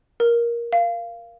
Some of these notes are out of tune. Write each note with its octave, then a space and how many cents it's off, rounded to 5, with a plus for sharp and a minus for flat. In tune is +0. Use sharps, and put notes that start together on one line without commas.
A#4 +15
F5 -15